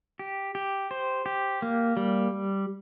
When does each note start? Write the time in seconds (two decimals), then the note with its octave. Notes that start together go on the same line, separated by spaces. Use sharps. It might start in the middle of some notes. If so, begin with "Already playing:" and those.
0.19 G4
0.55 G4
0.91 C5
1.26 G4
1.62 A#3
1.97 G3